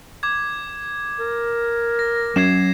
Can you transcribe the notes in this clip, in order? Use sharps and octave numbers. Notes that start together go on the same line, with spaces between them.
D6 G#6
A#4
A#6
F#3 C#4 G#6 C7 E7